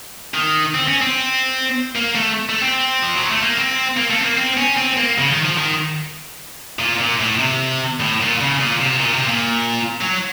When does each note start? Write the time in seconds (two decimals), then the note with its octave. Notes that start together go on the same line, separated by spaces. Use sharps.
0.34 D#3
0.75 C4
0.88 C#4
1.01 C4
1.95 A#3
2.15 A3
2.49 A3
2.62 C4
3.02 F3
3.16 F#3
3.30 A3
3.43 A#3
3.57 C4
3.96 A#3
4.10 A3
4.18 C4
4.24 A#3
4.37 C4
4.57 C#4
4.77 C4
4.97 A#3
5.18 C#3
5.31 D#3
5.44 F3
5.57 D#3
6.79 A#2
6.99 A#2
7.19 A2
7.39 C3
8.00 A2
8.20 A#2
8.40 C#3
8.61 A#2
8.81 C3
9.01 A#2
9.14 C3
9.27 A#2
10.01 F#3